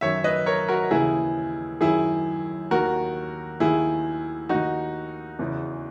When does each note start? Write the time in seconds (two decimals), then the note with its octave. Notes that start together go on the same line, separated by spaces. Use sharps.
0.01 F#2 D#3 C#5 E5
0.24 B4 D#5
0.46 A#4 C#5
0.68 F#4 A#4
0.91 D#2 C#3 E3 E4 G#4
1.81 F#2 D#3 E4 G#4
2.71 D#2 D#3 F#4 A#4
3.60 D#2 D#3 E4 G#4
4.49 D#2 D#3 D#4 F#4
5.39 E2 C#3 E3